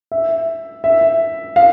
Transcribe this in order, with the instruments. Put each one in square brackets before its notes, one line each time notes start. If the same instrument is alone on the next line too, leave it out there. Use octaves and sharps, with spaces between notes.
[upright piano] E5
E5
F5